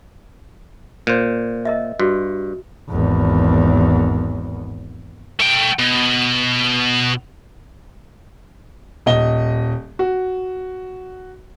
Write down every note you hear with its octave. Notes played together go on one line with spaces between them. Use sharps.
A#2 C5
A#4 D#5 E5
G2 F#4
G#1 E2
A3 G5
B2
D#1 D#5 G7
F#4